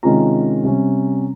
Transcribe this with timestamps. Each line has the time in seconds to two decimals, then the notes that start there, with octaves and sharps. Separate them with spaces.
0.03 C3 D#3 G#3 C#4 F4 A#5
0.63 C3 G3 C#4